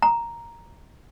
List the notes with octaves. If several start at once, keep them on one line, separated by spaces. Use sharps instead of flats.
A#5